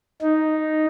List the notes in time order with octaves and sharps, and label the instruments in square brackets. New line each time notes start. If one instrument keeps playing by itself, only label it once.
[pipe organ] D#4